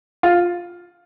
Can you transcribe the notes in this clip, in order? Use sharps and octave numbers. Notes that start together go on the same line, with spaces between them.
F4